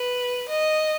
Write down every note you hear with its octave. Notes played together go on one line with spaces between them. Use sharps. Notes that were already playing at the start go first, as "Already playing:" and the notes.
Already playing: B4
D#5